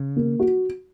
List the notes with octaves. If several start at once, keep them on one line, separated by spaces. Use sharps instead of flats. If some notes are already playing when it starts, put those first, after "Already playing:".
Already playing: C#3
A#3
F#4